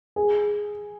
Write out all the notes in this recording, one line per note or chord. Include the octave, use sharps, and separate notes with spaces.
G#4